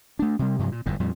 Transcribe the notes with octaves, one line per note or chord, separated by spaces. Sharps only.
A3 D4
C3 G3
G2 C3 F3 F#3
A#2
G1 F2 A2
F2 A#2 G3